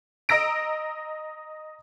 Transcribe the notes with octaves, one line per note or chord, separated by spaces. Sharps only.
D#5 A#5 E6 A#6 D7